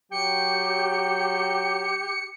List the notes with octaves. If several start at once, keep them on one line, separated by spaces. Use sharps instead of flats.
F#3 G4 G5 C#7